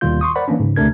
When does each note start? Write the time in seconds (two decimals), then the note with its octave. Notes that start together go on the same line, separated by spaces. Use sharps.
0.01 D#2 B2 D#3 G3 F4 G6
0.21 C6 C#6 D#6
0.36 A#4 C5 D5 F#5 B5
0.48 E3 A#3 C#4 D4
0.60 G#2 C#3
0.76 D2 C3 A3 D4 A#4 G#6